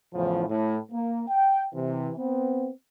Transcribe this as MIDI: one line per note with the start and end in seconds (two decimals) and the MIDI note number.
0.14 0.44 40
0.14 0.44 45
0.14 0.44 49
0.14 0.44 53
0.49 0.77 45
0.91 1.22 58
1.28 1.65 79
1.72 2.10 48
1.72 2.10 52
2.16 2.69 59
2.16 2.69 60